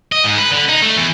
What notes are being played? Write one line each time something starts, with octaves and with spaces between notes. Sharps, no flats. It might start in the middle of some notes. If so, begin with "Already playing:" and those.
D#5
G#2
B4
D3
D#4
A3
E2